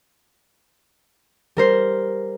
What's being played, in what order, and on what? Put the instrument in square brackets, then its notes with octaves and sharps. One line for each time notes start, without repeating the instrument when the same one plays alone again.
[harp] G3 A#4 C5